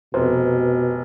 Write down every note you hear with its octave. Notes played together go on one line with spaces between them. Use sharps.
F1 B2 C5